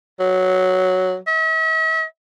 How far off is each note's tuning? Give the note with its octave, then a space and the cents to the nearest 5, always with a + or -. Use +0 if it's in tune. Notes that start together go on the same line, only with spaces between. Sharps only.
F#3 +0
E5 -45